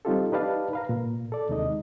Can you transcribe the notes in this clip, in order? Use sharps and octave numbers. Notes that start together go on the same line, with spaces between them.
G3 C4 D#4 F4 G4 A4
D#4 G4 B4 D5 F5 A5
B4 F5 A#5
A#2
A4 D5
D#2 C3 G#3 D#4 D#5